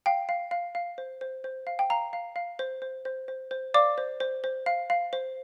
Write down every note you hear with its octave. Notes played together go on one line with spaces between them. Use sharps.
F5 G5
F5
F5
F5
C5
C5
C5
F5
G5
F5 A#5
F5
F5
C5
C5
C5
C5
C5
D5 F5 D6
C5
C5
C5
F5
F5
C5